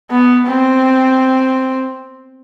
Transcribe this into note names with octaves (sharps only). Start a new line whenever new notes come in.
B3
C4